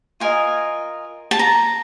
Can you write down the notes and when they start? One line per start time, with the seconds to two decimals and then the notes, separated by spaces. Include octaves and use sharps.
0.20 F4 A#4 D#5 G#5
1.31 A5
1.39 A#5